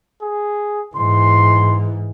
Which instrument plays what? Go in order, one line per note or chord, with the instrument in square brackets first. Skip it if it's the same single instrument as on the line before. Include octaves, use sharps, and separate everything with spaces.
[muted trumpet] G#4
[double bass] G#2 E3 [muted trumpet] C6